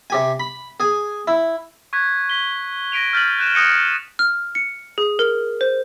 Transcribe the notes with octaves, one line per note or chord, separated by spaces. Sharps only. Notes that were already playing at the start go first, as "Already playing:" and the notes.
C3 G4 G#5
B5
G#4 G#5
E4
C#6 F#6 G#6 B6
B6 G7
A#6 B6 D7 D#7 F7
F6 G6 A6 B6 D#7 F#7
F#6 G6 D#7 E7
D#6 F#6 G6 A#6 C#7 D#7
F6
C#7
G#4
A#4
C5